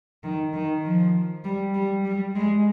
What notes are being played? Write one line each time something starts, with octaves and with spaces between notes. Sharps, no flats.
D#3
D#3
F3
G3
G3
G3
G#3